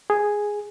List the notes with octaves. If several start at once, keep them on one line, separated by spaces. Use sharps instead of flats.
G#4